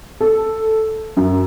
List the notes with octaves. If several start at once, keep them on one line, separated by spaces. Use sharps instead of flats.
A4
F#2